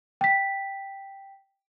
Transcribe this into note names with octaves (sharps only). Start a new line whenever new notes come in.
G5 B6